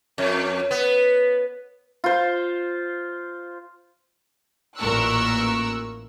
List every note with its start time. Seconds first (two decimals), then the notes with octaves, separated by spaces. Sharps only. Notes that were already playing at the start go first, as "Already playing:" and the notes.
0.18 F2
0.71 B3
2.04 F4 C5
4.78 A1 A#2 A#4 C#6 E6 F#6